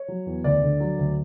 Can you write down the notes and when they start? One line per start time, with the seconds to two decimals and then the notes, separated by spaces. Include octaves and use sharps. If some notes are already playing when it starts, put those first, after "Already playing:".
Already playing: C#5
0.08 F#3
0.26 E2
0.44 D2 D5
0.63 D3
0.80 F#3
0.99 D2